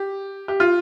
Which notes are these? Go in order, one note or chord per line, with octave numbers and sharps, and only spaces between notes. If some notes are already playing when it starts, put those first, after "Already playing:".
Already playing: G4
G4
F4